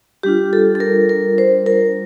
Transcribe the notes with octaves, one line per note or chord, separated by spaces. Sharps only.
G3 D4 F4 G4
A4
A4
A#4
A#4
C5
A#4